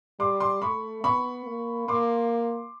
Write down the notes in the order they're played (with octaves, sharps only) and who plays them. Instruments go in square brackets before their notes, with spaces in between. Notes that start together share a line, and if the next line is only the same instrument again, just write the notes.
[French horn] G3 [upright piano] C6 D6
[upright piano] C6 D6
[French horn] A3 [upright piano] B5 C#6
[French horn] B3 [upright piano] B5 C#6
[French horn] A#3
[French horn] A#3 [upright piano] C6 D6